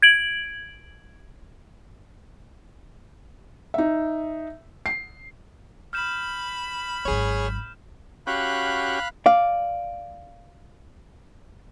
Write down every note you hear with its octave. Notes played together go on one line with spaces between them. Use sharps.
G#6 D7 F#7
D#4 E5
C7
B5 F6 G6 E7
G#1 F#3 G#4 C#5
C#4 F#4 G4 F5 B5 F#6
D5 F5